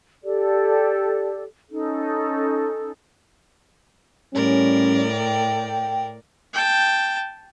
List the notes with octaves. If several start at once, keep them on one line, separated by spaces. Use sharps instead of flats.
G4 A4 D5
C#4 D#4 A4
A2 G3 C#4 A#4 D5
G5
G5 A5